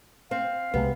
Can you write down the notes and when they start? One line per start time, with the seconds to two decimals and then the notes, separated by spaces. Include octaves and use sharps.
0.31 C4 F5
0.74 C2 C3 G#3 B3